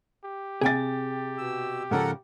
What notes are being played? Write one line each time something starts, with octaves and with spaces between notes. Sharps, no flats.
G4
C3 G#4 G5 G#5 A6
B2 E6
G#2 C#3 F3 A4 A#4 F#5